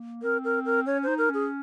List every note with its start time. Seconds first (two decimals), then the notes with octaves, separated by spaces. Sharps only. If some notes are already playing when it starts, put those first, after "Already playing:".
Already playing: A#3
0.23 C4 A#4
0.45 A#4
0.65 A#4
0.86 C#4 C#5
1.03 D#4 C5
1.18 A#4
1.30 C#4 G#4